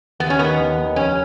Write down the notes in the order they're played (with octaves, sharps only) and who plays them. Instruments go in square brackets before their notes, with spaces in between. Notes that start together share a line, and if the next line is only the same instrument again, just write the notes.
[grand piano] D#2 [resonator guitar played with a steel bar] B3
[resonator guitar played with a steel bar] C#4
[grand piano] D#3 A#3 D#4 [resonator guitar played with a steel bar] B3
[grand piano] D#2
D#3 A#3 D#4
[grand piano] F1 [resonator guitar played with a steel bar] C#4